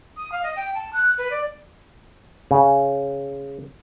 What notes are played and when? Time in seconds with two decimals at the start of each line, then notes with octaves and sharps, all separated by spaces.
0.16 D#6
0.32 F5
0.43 D#5
0.56 G5
0.74 A5
0.93 F#6
1.18 B4
1.30 D5
2.51 C#3